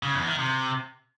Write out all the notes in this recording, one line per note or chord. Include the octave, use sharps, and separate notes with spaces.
C#3
E2
D#3
C3